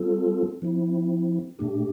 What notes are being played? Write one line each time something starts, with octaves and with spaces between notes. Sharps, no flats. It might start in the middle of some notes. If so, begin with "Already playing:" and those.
Already playing: G3 C4 F4 A4
F3 C4 E4
A#2 A3 D4 G4